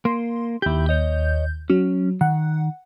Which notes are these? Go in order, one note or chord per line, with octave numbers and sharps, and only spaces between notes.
A#3 C6
D#2 E4 G4 G6
C#5 D#5
F#3 C#4
D#3 F#5